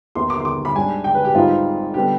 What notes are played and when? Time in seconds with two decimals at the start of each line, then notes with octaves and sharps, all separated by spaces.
0.15 D#2 D#3 B3 D#4 C6
0.30 D6
0.40 C6
0.45 D6
0.65 B5
0.75 G#2 G3 D4 G#5
1.04 G5
1.15 B4
1.25 G4
1.34 G#1 G#2 G3 C4 D#4 F4
1.94 D3 G3 B3 G4